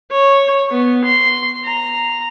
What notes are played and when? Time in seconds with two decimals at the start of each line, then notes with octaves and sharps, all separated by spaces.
0.11 C#5
0.71 B3
1.04 C6
1.64 A#5